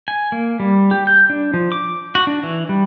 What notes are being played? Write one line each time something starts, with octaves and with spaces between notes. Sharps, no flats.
G#5
A#3
G3
G4
G6
D4
F3
D6
F#4
D4
E3
G3